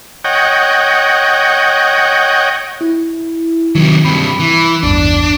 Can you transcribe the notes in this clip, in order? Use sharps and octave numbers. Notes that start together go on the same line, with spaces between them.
C#5 D#5 F#5 G5
E4
C3 D#3 F#3
G2 C3 B5
E3
A1 E2 G2 D4